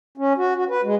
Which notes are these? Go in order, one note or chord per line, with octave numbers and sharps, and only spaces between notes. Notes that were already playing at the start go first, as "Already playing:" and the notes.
C#4
F#4
F#4
B4
G#3